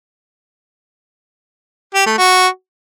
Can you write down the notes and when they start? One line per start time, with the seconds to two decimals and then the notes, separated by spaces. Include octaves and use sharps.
1.95 G4
2.06 A3
2.18 F#4